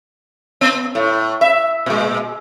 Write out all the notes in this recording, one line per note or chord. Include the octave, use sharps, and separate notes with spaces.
B3
A2
E5
A#2 G#3